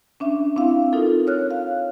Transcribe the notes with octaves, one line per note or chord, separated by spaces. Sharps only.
C#4 D4 E5
C4 D4 E4 F5
D#4 F4 A4 A#4
C#5 F6 F#6
F5